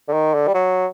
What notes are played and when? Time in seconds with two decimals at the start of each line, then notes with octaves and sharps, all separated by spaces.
0.08 D3
0.13 D#3
0.34 D3
0.47 G3
0.54 F#3